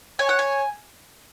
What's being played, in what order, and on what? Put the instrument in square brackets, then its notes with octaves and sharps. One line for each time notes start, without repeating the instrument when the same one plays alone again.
[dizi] C#5 [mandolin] G#5
[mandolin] F#5
G#5